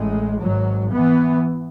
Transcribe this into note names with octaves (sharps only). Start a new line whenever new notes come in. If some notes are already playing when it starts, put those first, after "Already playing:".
Already playing: A1 A2 G#3
G#1 G#2 F#3
E3 B3